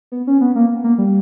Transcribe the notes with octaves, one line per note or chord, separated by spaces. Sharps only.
B3
C#4
B3
A#3
A#3
G3